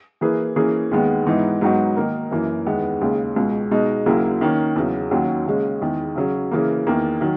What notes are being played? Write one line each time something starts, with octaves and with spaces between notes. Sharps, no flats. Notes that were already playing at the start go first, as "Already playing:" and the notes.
E3 A#3 E4 G#4 B4
E3 A#3 C#4 G#4
D#2 D#3 G#3 B3
G#2 E3 B3 D#4
G#2 F#3 B3 D#4 F#4
D#3 A#3 D#4 A#4
F#2 E3 A#3
E2 D#3 G#3 B3
D#2 C#3 G#3
C#2 B2 G#3
B2 G#3 D#4
D#2 C#3 F#3 A#3 E4
D#3 A#3 C#4
E2 C#3 F#3
D#2 D#3 F#3 C#4 F#4
D#2 C#3 G#3 C#4
E2 D#3 G#3
C#3 F#3 C#4
C#3 E3 A#3
E2 D#3 A#3
D#3 F#3